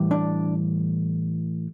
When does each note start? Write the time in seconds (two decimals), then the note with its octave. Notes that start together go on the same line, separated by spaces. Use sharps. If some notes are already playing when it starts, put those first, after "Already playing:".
Already playing: A2 E3 G3
0.11 D4